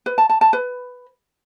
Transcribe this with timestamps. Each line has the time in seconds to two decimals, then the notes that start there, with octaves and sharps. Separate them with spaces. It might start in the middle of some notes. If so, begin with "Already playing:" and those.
0.06 B4
0.18 A5
0.29 A5
0.41 A5
0.53 B4